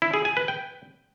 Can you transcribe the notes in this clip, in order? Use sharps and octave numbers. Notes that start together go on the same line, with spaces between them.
E4
G#4
G#5
B4
G5